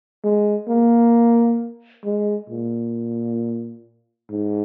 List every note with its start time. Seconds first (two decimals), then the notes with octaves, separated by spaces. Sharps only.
0.24 G#3
0.69 A#3
2.05 G#3
2.50 A#2
4.30 G#2